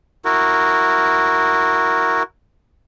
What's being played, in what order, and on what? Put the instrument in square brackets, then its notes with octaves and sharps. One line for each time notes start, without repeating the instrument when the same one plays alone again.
[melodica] E4 F#4 A#4